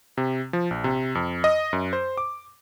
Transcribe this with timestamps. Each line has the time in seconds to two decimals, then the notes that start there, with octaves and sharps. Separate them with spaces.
0.17 C3
0.53 F3
0.71 A#1
0.84 C3
1.15 F2
1.44 D#5
1.73 F#2
1.93 C5
2.18 D6